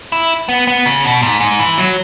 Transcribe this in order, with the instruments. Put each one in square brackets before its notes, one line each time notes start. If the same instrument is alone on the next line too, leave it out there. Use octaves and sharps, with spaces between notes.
[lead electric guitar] E4
B3
B3
C#3
B2
G#2
G#2
E3
F#3